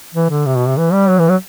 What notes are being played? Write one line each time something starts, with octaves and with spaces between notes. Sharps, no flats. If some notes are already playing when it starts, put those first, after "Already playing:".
E3
D3
C3
B2
C3
E3
G3
F#3
E3
F#3